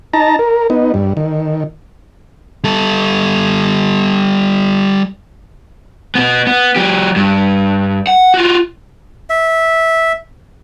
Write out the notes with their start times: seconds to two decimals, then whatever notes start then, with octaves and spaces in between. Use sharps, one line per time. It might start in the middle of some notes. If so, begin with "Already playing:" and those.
0.14 D#4 A5 A#5
0.39 A#4
0.70 B3 D#4
0.94 G2
1.17 D#3
2.64 G3 A4
6.15 B2 B3
6.47 B3
6.76 F#3 G4
7.16 G2
8.07 F#5
8.34 F4 F#4
9.30 E5